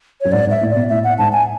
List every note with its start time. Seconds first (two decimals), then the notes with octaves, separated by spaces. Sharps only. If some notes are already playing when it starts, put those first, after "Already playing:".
0.21 F#2 C#5
0.32 G#2 D5
0.46 G#2
0.51 E5
0.61 A2
0.70 B2 D5
0.89 A2 E5
1.04 F#5
1.18 G#2 A5
1.33 G#5